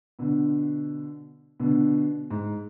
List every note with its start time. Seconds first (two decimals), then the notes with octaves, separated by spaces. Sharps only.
0.19 B2 D3
1.60 B2 D3
2.30 G#2